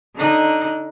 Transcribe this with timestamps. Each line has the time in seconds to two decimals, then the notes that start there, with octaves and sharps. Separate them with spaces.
0.16 D3 D#4 F#6